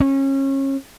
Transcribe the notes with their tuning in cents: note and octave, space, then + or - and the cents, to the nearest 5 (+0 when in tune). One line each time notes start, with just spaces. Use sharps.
C#4 -30